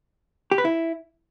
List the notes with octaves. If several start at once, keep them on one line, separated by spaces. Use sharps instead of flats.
G4
B4
E4